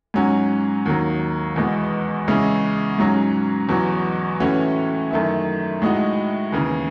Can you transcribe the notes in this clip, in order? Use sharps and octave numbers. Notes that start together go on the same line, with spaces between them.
G#2 F#3 C#4 F#4
D#2 D#3 F#3
E2 B2 G#3 B3
E2 C#3 G#3 C#4 E4
G#2 F#3 C#4 F#4
E2 B2 F#3
A2 E3 A3 C#4 F#4
F#2 D#3 A3 E4
A2 G#3 D#4 F#4
D#2 C#3 E3